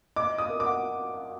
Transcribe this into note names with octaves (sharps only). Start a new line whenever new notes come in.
D#5 D6
D#5
D#6
A#4
D6
F#5